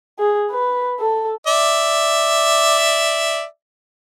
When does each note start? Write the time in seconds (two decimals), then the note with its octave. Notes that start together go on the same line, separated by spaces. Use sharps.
0.19 G#4
0.52 B4
1.00 A4
1.47 D5 E5